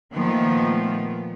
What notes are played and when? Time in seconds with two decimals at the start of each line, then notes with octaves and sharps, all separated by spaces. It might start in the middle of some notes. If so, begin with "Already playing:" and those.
0.15 A#2 D#3 F3 A3 B3